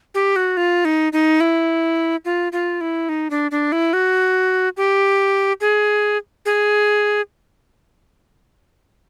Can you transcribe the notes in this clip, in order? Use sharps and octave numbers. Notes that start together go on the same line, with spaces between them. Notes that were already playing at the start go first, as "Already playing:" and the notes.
G4
F#4
F4
D#4
D#4
E4
F4
F4
E4
D#4
D4
D4
E4
F#4
G4
G#4
G#4